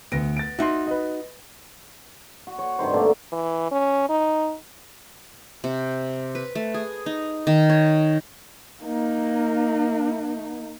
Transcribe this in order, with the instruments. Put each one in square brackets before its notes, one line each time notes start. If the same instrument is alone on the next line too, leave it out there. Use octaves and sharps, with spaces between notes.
[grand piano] D2 A#6 D7 [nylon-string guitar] B3
[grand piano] A6 D7
[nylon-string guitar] D#4 F#4 [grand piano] E5 C6
[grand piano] B4 D#5
[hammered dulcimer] F#4
C#5
G2 C3 D#3 C5
B2 D3 A3 A#3
[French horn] E3
C#4
D#4
[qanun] C3
B4
A3
G#4
D#4
D#3
C#5
[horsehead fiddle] A#3 D#4